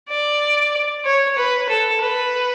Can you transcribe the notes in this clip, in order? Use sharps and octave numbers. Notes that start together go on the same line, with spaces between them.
D5
C#5
B4
A4
B4